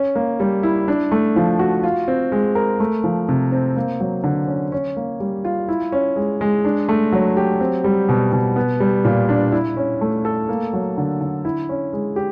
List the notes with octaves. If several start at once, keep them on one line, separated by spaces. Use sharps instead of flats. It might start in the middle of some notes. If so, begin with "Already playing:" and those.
Already playing: C#4
A#3
G3
E4
D4
A3
F3
F#4
F4
C4
G#3
A#4
A3
F3
C3
C4
A#3
F#3
D3
C#4
C#4
A#3
G3
F4
E4
C#4
G#3
G#3
D4
A3
F#3
G4
C4
G3
B2
B2
B3
G3
A#2
D4
E4
C#4
A3
A4
A#3
F#3
D3
D3
E4
C#4
G#3
G4